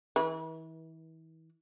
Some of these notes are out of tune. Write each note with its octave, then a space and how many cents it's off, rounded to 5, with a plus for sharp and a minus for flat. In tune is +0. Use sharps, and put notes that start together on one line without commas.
E3 -35 B4 -45